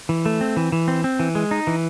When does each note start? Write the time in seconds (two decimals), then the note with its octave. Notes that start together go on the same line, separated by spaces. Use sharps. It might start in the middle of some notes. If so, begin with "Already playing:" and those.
0.09 E3
0.26 A3
0.41 C4
0.57 E3
0.72 E3
0.88 C4
1.04 C4
1.20 E3
1.35 G#3
1.51 D#4
1.67 E3